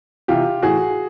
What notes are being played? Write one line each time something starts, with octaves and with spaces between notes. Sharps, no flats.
C3 E3 F4 G4
A2 E3 F#4 G#4